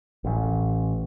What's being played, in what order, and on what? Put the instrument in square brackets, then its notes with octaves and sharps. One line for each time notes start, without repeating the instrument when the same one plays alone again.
[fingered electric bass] A1